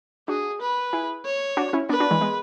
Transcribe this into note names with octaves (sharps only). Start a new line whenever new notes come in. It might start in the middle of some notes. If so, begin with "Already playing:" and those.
D4 F#4 G#4
B4
E4 G#4
C#5
D4 F#4
C#4 E4
B3 D4 B4
D4 F#4
E3 G#3
G#3 B3